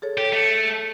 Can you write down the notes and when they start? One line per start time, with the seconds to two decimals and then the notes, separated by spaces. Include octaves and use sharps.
0.02 G#4 A4 C#5
0.18 G4 A4
0.32 A3